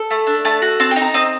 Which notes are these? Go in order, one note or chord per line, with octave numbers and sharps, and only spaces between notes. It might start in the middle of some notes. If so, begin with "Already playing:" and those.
Already playing: A4
A3
D4
A3 A5
F#4
C4 A5
G5
D#4
A#5
C4 D#5